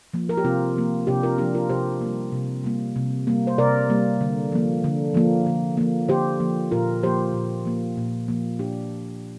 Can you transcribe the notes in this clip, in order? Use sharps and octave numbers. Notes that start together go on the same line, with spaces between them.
F3 A#3
A#4
G4
C3 C4 F4
F3 A#3
C3 D4 G4
F4 A#4
F3 A#3 D4 G4
F4 A#4
C3 G4 C5
G3 A#3
C3
G3 A#3
C3
G3 A#3
C5
C3 A#4 D5
G3 A#3
D3
F3 A#3
D3
F3 A#3
D3
F3 A#3
D3 G4 C5
F3 A#3
A#2 F4 A#4
F3 A#3 G4 C5
A#2
F3 A#3
A#2
F3 A#3
A#2 D4 G4